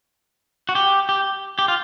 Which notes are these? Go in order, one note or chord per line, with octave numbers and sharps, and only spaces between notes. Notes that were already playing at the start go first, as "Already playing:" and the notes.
F#4
G4
G4
G4
F4